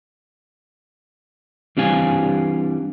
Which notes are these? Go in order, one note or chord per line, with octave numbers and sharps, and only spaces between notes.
E3 G3 C4 D4 F5 G#5